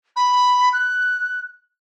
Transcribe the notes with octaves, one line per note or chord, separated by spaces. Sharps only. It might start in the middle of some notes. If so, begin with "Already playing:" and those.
B5
F#6